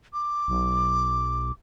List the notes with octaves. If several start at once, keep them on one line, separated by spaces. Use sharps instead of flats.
D6
B1